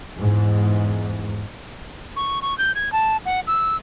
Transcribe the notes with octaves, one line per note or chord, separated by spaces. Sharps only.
E2 G#2
C#6
C#6
G6
G#6
A5
F#5
E6